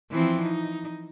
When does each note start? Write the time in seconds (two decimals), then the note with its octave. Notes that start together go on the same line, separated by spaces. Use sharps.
0.11 E3 F3 C4
0.43 D#4